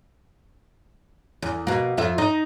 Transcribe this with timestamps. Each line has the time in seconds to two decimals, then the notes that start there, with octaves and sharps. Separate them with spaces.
1.42 E2
1.67 B2 A#3
1.97 F2 F4 E5
2.18 D#4